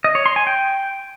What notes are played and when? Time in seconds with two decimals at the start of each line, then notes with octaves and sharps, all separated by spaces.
0.04 D#5
0.15 C#5
0.26 C6
0.36 G#5
0.47 G5